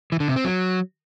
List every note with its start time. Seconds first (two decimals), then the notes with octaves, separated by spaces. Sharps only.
0.12 E3
0.20 D3
0.28 C3
0.36 C4
0.44 F#3